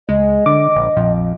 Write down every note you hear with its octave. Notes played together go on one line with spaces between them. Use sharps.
C#2 G#3 D#5
D3 D6
A#1
A#1 F2